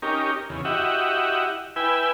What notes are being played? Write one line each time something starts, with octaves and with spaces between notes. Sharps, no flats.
C#4 D#4 G4 A#4
E2 C#3
E4 F#4 G4 D#5 E5 F#5
E4 B4 G5 G#5 E6